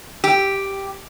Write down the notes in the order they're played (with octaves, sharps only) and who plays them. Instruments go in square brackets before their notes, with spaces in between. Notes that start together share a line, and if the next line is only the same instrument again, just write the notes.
[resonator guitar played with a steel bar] G4